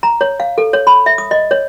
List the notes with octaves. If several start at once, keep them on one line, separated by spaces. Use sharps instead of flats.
A#5
C#5
F5
A4
C#5
B5
E5
D#6
D#5
C#5